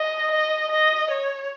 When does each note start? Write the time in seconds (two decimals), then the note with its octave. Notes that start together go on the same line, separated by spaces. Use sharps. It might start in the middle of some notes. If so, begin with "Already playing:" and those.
Already playing: D#5
0.32 D#5
0.72 D#5
1.11 C#5